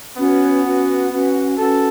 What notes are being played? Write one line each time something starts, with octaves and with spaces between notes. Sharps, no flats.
B3 C#4 F#4 B4 F#5
C#4 F#4 B4 F#5
C#4 F#4 B4 F#5
C#4 F#4 A4 B4 F#5